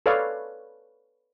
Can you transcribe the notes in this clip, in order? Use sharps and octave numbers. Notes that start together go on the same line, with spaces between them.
A4 B4 C#5 D5 F5